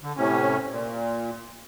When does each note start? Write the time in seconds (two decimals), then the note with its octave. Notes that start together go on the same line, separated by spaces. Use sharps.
0.01 D3
0.17 A2 C3 C#4
0.70 A#2